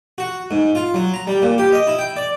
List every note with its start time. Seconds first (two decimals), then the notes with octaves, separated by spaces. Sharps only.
0.18 F#4
0.51 G#2
0.75 F4
0.94 F#3
1.14 A#5
1.27 G3
1.42 A#2
1.58 G4
1.72 D#5
1.87 E4
1.99 G5
2.16 D5